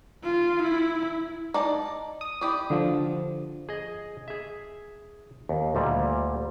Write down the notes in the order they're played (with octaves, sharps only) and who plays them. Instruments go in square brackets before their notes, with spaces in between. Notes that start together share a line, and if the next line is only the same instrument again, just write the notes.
[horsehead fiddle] F4
E4
[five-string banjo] D#4 D5 A5
[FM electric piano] D#6
[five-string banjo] E4 G4 D5
[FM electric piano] D3 F3
[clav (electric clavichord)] G#4 D#5
G#4 E5
D#2
D2 A#2 G3